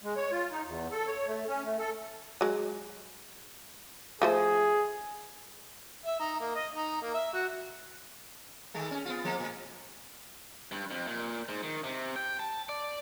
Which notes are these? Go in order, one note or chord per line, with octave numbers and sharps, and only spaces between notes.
G#3
C#5
F4
D#4
E2
A4
C#5
A3
C#4
A3
A4
F#3 G#3
F3 A3 G#4 C5
E5
D#4
A#3
D#5
D#4
A#3
E5
F#4
D#3 G#3 A3
C#4
B3 F4
F3 G#3 A#3
A2
G2
F2
A#2
G#2
D#3
C3
G5
A5
D5